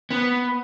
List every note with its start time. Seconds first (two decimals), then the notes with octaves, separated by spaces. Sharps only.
0.11 B3